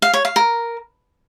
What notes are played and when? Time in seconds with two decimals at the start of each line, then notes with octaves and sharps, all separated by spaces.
0.02 F5
0.13 C#5
0.25 F5
0.36 A#4